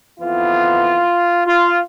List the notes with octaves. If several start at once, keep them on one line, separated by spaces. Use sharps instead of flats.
F2 E3 B3 F4
F4